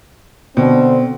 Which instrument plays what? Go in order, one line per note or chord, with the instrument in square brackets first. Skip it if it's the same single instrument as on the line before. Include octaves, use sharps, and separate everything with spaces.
[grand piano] B2 [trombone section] D3 C4